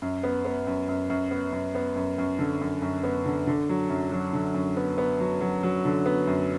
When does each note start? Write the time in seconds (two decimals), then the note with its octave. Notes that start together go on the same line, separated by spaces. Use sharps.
0.02 F#2
0.23 B3
0.45 B3
0.67 F#2
0.88 F#2
1.10 F#2
1.31 B3
1.53 F#2
1.75 B3
1.96 F#2
2.18 F#2
2.39 D3
2.61 F#2
2.82 F#2
3.03 B3
3.26 D3
3.47 D3
3.69 F#3
3.90 F#2
4.12 F#3
4.33 D3
4.54 F#2
4.77 B3
4.98 B3
5.20 F#3
5.41 F#3
5.63 F#3
5.85 D3
6.06 B3
6.27 F#2